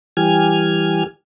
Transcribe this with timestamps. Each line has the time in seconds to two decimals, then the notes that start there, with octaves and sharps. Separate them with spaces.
0.17 E3 G3 G4 G#5 F6 G#6